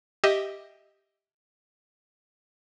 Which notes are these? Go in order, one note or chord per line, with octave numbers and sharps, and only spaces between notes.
G4 D#5 E5